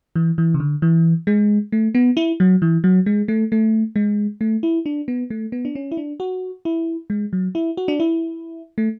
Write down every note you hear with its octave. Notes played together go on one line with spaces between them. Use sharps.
E3
E3
C#3
D3
E3
G#3
A3
B3
E4
F#3
E3
F#3
G#3
A3
A3
G#3
A3
E4
D4
B3
A3
B3
D4
C#4
E4
D4
F#4
E4
G#3
F#3
E4
F#4
D4
E4
A3